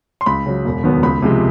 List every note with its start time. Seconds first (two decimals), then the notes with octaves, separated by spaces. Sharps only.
0.21 C6
0.26 C#2 B5
0.46 C#3 F#3
0.65 E1
0.83 D#2 D#3 F#3 B3
1.03 C#2 B5
1.22 C3 F3 G#3